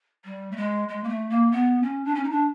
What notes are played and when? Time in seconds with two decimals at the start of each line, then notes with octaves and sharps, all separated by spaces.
0.25 G3
0.51 A3
0.57 G#3
0.89 G#3
1.04 A#3
1.09 A3
1.30 A#3
1.52 B3
1.83 C#4
2.05 D4
2.15 C#4
2.24 D#4
2.30 D4